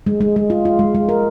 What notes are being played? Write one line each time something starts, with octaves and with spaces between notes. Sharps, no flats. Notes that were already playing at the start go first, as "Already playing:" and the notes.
G#3
G#3
G#3
F4
F4
G#3
G#3
A#4